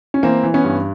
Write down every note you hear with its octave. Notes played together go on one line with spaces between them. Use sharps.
C#4
E3 A#3 C4
E3
B3 C#4
G2